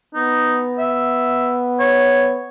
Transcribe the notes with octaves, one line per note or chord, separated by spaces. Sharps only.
B3 D#4
E5
C#5